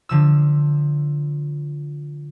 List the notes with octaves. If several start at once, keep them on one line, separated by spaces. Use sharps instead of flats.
D3 F3 E6